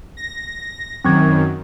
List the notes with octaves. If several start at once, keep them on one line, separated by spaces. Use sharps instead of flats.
A#6
F#2 D#3 C4 C#6 G#6